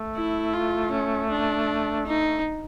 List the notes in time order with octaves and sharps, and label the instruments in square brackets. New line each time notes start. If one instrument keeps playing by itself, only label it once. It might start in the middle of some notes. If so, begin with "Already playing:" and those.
Already playing: [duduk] A3
[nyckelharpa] E4
F4
C#4
D4
D#4